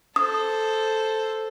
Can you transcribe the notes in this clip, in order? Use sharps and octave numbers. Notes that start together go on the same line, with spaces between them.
A4 C5 D#6